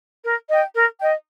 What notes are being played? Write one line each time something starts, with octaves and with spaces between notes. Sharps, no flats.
A#4
D#5 G5
A#4
D#5 G5